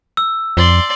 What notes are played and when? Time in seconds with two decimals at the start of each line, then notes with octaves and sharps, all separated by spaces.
0.17 E6
0.57 F2 D5 C6